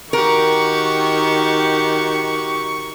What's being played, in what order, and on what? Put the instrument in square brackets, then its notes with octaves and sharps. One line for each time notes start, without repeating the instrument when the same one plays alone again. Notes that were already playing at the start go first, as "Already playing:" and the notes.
[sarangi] D#3 [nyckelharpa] F#4 G4 [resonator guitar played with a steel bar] A#4 [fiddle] C#6